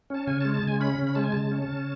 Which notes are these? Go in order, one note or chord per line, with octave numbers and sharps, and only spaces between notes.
C#4 A5
C#3 G#5
A5
G#3
A5
C#3 G#5
C#4 B5
C#3
B5
G#3 A5
G#5
C#3 A5
C#4
C#3